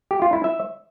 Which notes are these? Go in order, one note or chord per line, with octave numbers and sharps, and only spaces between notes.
G4
F4
E4
E5